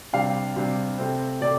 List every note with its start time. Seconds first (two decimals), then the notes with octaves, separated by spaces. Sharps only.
0.13 C3 G3 D4 F5
0.56 C3 G3 D4
0.98 C3 A3 C4
1.41 C3 A3 D5